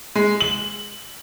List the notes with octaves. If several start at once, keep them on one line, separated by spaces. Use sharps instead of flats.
G#3
F#7